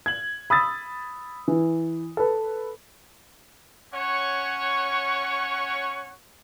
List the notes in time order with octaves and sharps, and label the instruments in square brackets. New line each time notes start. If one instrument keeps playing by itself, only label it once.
[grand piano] G#6 F#7
B5 D#6 E6 A6
E3
A4 B4
[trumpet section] C#4 C#5 F#5 C#6